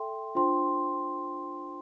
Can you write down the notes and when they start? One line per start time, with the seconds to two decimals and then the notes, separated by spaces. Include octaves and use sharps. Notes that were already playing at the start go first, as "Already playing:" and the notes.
Already playing: A4 E5 G5 C6
0.35 D4 F4 C5 G5 C6